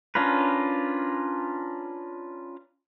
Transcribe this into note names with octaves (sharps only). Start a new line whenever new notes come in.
C#4 D4 F4 A#4 B4